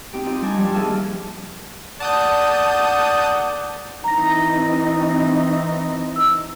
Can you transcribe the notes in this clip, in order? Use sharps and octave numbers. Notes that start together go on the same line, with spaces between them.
C4 D#4 G4
D#4 F4 D#5
G3 D4 G#5
F3 G3
D#2 G#4 E5 A5 F6
D#2 A3 D5 F#5 A5 D#6 G6
E3 C4 D#4 A#5 A#6
E6